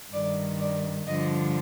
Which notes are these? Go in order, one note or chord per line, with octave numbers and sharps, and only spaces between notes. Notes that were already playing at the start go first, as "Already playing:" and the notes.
G2 D#3 D5
D5
G2 D3 F3 D#5